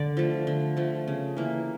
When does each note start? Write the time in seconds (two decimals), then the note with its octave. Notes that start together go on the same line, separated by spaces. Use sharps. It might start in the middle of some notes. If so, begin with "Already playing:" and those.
Already playing: D3 D5
0.17 F3 A3
0.47 D3
0.77 F3 A3
1.08 C#3
1.37 E3 A#3